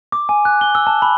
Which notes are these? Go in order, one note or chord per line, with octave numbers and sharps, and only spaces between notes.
D6
G#5
F#6
G7
E6
A5
B5